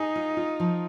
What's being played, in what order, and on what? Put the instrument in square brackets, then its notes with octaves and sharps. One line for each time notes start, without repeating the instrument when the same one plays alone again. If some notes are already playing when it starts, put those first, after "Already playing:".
Already playing: [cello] D#4 [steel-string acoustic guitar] G#4
[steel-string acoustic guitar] F4
F4
F3